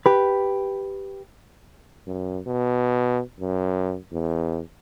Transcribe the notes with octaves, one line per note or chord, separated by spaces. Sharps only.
G4 B4
F#2
B2
F#2
E2